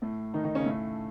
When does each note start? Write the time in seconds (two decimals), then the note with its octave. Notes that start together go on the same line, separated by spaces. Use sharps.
0.02 A2 A3
0.34 D#3 D#4
0.44 D#3 D#4
0.55 C#3 C#4
0.65 A2 A3